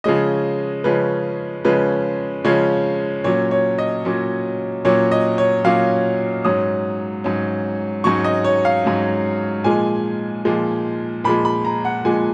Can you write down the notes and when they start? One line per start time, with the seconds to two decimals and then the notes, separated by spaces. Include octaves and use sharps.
0.04 C#3 F3 G#3 C#4 D#5
0.84 C#3 F3 G#3 C#4 B4
1.65 C#3 F3 G#3 C#4 B4
2.44 C#3 F3 G#3 C#4 C#5
3.24 A#2 F#3 C#4 C#5
3.51 C#5
3.78 D#5
4.05 A#2 F#3 C#4
4.85 A#2 F#3 C#4 C#5
5.12 D#5
5.38 C#5
5.64 A#2 F#3 C#4 F5
6.45 G#2 F#3 C#4 D#6
7.24 G#2 F#3 C#4
8.04 G#2 F#3 C#4 C#6
8.24 D#5
8.45 C#5
8.65 F5
8.84 G#2 F#3 C#4
9.64 A#2 F3 G#3 G#5
10.45 A#2 F3 G#3
11.24 A#2 F3 G#3 B5
11.45 B5
11.65 A#5
11.85 F#5
12.05 A#2 F3 G#3 G#5